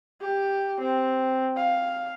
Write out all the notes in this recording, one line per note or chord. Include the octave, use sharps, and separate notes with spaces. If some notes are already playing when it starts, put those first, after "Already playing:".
G4
C4
F5